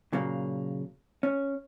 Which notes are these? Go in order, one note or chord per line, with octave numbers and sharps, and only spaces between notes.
A#2 C#3 F#3 A#3
C#4